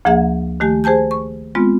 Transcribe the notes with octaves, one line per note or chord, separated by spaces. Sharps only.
D2 F3 A#3 G#4 E5 F#5
D#3 A3 G4 G#5
G#4 C5 G#5 A5 G6
C#6
G#3 B3 C4 F4